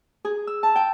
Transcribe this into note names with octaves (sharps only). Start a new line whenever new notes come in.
G#4
E6
A5
G5